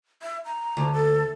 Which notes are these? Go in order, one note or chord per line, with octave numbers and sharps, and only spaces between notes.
E5
A#5
D2
A4